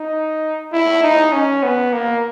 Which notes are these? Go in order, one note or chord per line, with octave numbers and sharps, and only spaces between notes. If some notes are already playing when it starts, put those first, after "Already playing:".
Already playing: D#4
E4
D#4
C#4
B3
A#3